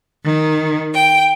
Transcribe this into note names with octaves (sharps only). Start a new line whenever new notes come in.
D#3
G5